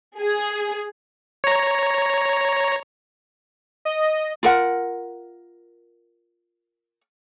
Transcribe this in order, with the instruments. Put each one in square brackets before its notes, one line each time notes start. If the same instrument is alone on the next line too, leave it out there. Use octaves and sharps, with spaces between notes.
[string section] G#4
[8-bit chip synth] C#5 A#5
[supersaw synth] D#5
[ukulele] F4 A#4 F#5